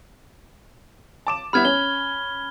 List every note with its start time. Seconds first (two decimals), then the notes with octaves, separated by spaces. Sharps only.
1.27 A5 D6 E7
1.53 G3 B3 E4 B5 F6 G#6
1.65 C#4 G7